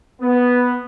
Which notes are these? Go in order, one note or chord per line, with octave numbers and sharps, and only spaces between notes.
B3